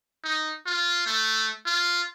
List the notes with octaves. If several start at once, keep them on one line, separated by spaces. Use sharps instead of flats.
D#4
F4
A3
F4